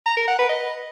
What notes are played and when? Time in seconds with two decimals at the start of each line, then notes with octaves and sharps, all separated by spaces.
0.06 A#5
0.17 A#4
0.28 F#5
0.38 B4
0.49 D#5